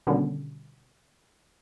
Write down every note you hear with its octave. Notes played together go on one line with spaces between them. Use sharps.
B2 D3 D#3 G3 C#4